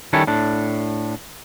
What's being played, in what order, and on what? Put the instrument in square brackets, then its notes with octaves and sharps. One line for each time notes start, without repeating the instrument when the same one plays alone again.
[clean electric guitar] D#3 G3 C#4 E4 A4 C#5
A2 D4